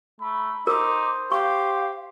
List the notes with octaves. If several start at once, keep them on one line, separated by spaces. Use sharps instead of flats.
A3 B5
D#4 A#4 C5 D6
G4 F5 C#6